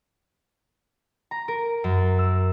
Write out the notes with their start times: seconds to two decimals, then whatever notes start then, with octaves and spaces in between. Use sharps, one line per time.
1.31 A#5
1.48 A#4
1.84 F#2
2.19 E6